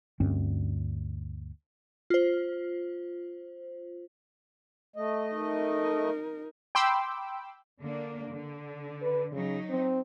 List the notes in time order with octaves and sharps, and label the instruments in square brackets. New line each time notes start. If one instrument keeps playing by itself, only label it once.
[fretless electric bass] D2 G2 C4 C#4
[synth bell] F4 C5
[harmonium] A3 D#5
[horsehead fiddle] D#4 A#4
[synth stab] G5 B5 C6 D6 E6
[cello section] D3 A#3 D4
D3
[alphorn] B4
[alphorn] C#3 [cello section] F#3 D#4
[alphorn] C4